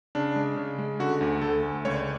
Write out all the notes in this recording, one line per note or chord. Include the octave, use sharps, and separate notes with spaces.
C#3 D4
G#3
C#3
G#3
D3 F#4
D2
D2 A4
D2
C#2 C#5
D5